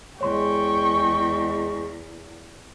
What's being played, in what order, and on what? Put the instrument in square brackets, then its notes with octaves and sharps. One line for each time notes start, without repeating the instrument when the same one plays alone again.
[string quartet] E2 [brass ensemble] G#3 [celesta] C#5 C6 [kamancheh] G5 C#6